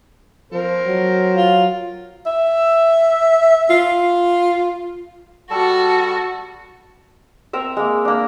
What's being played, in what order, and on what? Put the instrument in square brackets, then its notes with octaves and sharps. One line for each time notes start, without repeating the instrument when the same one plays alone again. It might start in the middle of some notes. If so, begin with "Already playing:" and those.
[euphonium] F3 [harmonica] C4 A#4 C5
[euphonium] F#3
[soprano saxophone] F4
[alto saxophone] E5
F4
[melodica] G3 A4 A5 [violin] F#4
[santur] C4 A#4 E5
G#3 A#3
A#3 D4